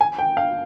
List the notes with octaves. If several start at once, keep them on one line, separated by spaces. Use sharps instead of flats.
G#5
G5
F5